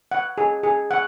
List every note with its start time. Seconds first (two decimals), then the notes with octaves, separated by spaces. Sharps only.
0.12 F#5
0.38 G#4
0.64 G#4
0.91 F#5